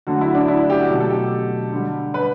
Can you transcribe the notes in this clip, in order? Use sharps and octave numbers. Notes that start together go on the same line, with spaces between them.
D3 F#3 A3 F#4
E4
D4
E4
G4
F#4
B2 F#3 A3
A4
G4
D3 G3
B4